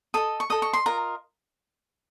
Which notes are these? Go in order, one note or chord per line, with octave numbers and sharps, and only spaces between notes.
A4 D#5 D#6
C#6
A4 D#5 D#6
C#6
C6
F4 A#4 D#5 A#5